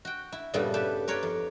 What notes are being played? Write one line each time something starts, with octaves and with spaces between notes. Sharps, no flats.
F#4 G5
E4
G2 A#2 C#3 G3 A3 B3
G4 A4 B4 E5
A#4 B4 C#5 D5 G5
F2